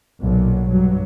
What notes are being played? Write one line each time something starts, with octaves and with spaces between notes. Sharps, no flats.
B1 A#2 F#3
G2 F#3